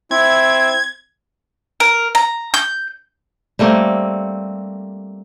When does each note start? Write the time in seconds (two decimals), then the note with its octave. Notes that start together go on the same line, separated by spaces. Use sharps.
0.11 C4 E4 G#6
1.80 A#4
2.15 A#5
2.54 G6
3.59 G3 A3 A#3 C4